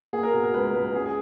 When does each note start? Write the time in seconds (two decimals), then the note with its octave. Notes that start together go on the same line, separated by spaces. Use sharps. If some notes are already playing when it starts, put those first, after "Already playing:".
0.13 A#3 G#4
0.23 A#4
0.33 B2
0.44 A#4
0.54 C#2 B4
0.75 C#2 B4
0.96 C#4 G#4
1.06 G#4